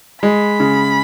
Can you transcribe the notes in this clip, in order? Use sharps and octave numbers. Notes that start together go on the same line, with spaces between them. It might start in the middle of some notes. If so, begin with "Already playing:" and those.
G#3 B5
C#3